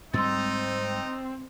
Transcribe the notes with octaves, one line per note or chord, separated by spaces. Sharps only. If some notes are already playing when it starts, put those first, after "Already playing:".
G#2 G3 G#3 C4 D#4 C6 E6 A6